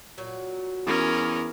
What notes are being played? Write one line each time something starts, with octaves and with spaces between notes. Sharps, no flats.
A#2 F#3 F#4
E2 C#4 A#4